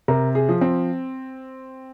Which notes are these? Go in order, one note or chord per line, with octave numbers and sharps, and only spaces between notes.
C3 A#4
G#4
F3
C4